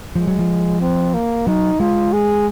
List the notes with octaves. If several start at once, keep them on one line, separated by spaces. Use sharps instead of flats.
F3 G#3
F#3
F3
C4
A#3
F#3 D#4
G#3 F4
G#4